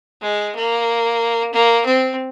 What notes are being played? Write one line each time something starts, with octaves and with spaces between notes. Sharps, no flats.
G#3
A#3
A#3
C4